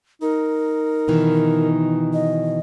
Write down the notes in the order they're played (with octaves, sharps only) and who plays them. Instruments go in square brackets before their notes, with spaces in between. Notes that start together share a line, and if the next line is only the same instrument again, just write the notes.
[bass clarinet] D#4 [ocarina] A#4
[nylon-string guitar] B2 D#3 E3
[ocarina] D#5